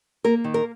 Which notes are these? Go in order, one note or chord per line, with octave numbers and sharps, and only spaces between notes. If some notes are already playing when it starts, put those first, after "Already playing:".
A#3 A#4
D#3
A#4